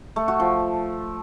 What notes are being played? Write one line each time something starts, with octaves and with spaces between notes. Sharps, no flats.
A3
F#4
F3